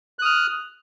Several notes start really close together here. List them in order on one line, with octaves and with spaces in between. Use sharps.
F#6 D#6 F6